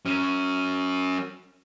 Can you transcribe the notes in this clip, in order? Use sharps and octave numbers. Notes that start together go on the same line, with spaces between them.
F#3 C#4